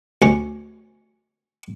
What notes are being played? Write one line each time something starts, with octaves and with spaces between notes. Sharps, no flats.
D2 C#4